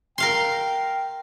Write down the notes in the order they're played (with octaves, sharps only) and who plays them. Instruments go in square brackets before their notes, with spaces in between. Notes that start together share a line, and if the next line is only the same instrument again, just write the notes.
[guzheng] A#4 F5 C6 [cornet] G5